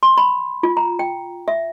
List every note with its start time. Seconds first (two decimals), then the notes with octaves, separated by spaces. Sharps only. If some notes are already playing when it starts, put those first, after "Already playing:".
0.03 C6
0.18 B5
0.63 F4
0.77 A#5
0.99 G5
1.48 E5